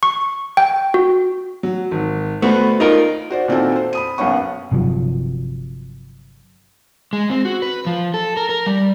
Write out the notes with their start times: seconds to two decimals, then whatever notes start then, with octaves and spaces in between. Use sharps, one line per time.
0.03 C#6
0.57 G5
0.94 F#4
1.63 F#3
1.91 G#1
2.42 A3 B3 F#4 B4 C5
2.80 D#4 F4 A#4 D#5
3.30 F#4 C5 D5
3.48 A#2 D#3 C4 E4 F#4 A4
3.75 C5
3.93 B5 D#6 D#7
4.18 F#1 B1 B3 C#4 F#5 C#6
4.71 G1 C3 F3 F#3
7.13 G#3
7.30 C4
7.45 F#4
7.62 B4
7.86 F3
8.14 A4
8.37 A#4
8.49 A#4
8.66 G3